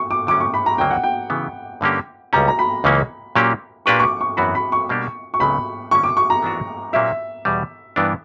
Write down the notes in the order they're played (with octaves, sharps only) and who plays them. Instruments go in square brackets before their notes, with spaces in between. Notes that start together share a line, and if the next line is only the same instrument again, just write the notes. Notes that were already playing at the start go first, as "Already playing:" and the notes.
Already playing: [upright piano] C#6
D6
[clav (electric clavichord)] D3 F#3 C#4 [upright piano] D6
[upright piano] C#6
B5
A#5
[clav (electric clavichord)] D2 C#3 F#3 A#3 [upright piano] G5
[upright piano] F#5
G5
[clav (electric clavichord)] C#3 E3 B3
G2 D3 A#3 C#4 G4
[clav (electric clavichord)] C#2 C#3 G3 C#4 [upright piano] A#5
[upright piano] A#5
B5
[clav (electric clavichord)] C#2 C#3 E3 A#3 C#4
A#2 F#3 A#3 C#4 G4
[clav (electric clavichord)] A#2 A#3 D4 G4 B4 [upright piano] C#6
[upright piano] C#6
D6
C#6
[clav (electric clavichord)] F#2 E3 B3 F#4 A#4 [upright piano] B5
[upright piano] B5
C#6
[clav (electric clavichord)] B2 G3 A#3 D4 G4
[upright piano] C#6
[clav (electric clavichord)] C#2 C#3 F#3 [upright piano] B5
[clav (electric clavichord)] G2 D3 A#3 C#4 [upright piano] C#6
[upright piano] D6
C#6
A#5
[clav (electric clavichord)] E3 B3 D4 F#4
[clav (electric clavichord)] A#2 F#3 A#3 C#4 G4 [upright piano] E5
[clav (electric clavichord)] E2 B2 G3
G2 E3 B3 D4 A#4